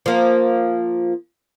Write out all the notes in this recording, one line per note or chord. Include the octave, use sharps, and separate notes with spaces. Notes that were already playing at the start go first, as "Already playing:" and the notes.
F3 A#3